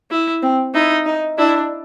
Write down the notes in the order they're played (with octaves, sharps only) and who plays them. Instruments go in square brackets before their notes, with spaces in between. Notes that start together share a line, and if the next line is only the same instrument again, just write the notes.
[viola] E4
[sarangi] C4
[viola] D#4 [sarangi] E4
[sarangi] D#4
[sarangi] D4 [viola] E4